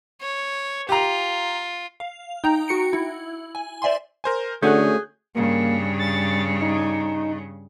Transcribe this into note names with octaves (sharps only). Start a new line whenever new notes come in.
C#5
F4 G4 A#5
F5
D#4 G5 A#5
F#4 C#7 D7
E4
G#5
C5 D5 E5 G#5 C6
A#4 C5 G#5
D3 A3 C#4 F#4 G#4 F#6 G6
G2 C#3 A#3
A6
D#4